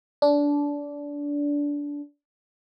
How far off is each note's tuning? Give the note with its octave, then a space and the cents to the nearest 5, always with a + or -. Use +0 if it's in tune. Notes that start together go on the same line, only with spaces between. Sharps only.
D4 -20